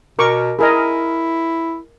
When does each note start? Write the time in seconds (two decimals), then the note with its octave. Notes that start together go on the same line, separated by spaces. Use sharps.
0.19 B2 A#4 C#6 D6
0.59 E4 G#4 A#4 D#5